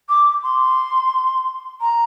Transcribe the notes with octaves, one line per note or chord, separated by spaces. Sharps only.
D6
C6
A#5